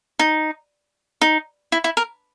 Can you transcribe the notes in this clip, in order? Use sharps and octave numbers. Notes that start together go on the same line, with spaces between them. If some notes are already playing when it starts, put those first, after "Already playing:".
D#4
D#4
E4
E4
A#4